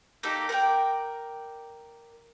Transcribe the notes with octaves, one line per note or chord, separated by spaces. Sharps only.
A#3 D#4 G4 A4
A#4 D5 F#5 G5